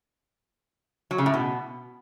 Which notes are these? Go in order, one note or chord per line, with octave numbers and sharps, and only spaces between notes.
F#3
C#3
A2
B2